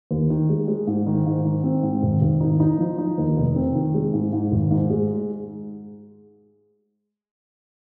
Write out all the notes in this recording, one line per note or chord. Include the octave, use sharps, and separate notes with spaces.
D#2
D#3
G#3
G#3
G#2
D#3
G#2
D#3
C4
G#2
G#1
G#1
D#4
D#4
F3
D#4
D#2
F1
C4
D#3
G#3
G#2
G#2
G#1
G#2
G#3